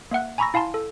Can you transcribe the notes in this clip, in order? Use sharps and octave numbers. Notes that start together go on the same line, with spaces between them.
A#3 E5 F#5 F#6
G#5 A#5 B5 C#6 E6 A#6
E4 F5 G#5 A5 C6
A4